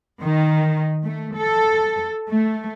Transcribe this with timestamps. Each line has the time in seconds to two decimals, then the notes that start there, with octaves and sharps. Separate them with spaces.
0.21 D#3
1.04 A3
1.35 A4
2.30 A3